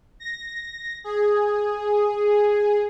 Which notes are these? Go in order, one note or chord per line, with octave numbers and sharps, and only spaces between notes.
A#6
G#4